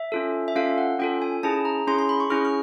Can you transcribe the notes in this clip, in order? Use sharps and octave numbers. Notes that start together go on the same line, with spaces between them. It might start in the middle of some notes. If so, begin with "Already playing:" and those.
Already playing: E5
C#4 F4 A4
E5
C#4 F4 A4 F5
F#5
C#4 F4 A4 G5
G#5
C#4 E4 G#4 A5
A#5
C#4 E4 G#4 C6
C6
B5
C#6
C#4 E4 G#4 F6
F6